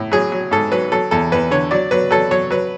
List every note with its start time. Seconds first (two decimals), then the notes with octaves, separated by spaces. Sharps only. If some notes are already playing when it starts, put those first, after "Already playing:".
Already playing: A2
0.12 F#3 G#4
0.32 F#3
0.51 G#2 A4
0.72 F#3 B4
0.92 F#3 A4
1.11 E2 A4
1.32 E2 B4
1.51 D3 C#5
1.71 F#3 D5
1.91 F#3 B4
2.11 F#3 A4
2.31 F#3 C#5
2.50 F#3 B4